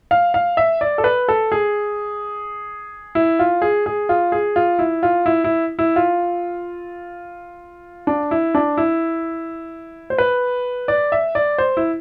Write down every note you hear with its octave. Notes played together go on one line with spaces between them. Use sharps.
F5
F5
E5
D5
A4
B4
A4
G#4
E4
F4
G#4
G#4
F4
G#4
F4
E4
F4
E4
E4
E4
F4
D4
E4
D4
E4
C5
B4
D5
E5
D5
C5
E4